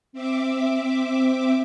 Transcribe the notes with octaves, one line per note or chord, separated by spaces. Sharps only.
C4 E5 D6